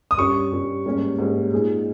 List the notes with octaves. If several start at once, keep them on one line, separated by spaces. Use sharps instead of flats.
D#6
G2 G3 C#4 C#6
G2 G3 C#4
G#2 G3 A#3 C#4
G#2 G3 A#3 C#4
A#2 G#3 D#4 G#4